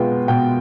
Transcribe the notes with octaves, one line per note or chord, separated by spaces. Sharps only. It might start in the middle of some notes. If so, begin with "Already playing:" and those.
Already playing: B2 G#3 B3 F4 G5
B2 G5